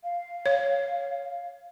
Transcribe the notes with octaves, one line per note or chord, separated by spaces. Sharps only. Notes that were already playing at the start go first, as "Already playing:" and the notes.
F5
C#5